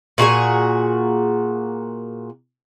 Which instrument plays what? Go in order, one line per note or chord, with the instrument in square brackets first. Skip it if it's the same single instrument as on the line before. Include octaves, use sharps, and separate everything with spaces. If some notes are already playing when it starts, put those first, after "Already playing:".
[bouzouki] A#2 F#4 G#4 G#5